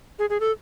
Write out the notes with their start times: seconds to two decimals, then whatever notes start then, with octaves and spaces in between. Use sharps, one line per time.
0.19 G#4
0.30 G#4
0.40 A4